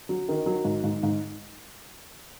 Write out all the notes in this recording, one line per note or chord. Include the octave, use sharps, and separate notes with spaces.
F#3
D#3
F#3
G#2
G#2
G#2